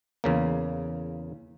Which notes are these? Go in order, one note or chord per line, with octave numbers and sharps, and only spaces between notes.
E2 C#3 A#3